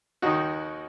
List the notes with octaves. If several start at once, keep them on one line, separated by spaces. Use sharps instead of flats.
D#2 D#3 D#4 F#4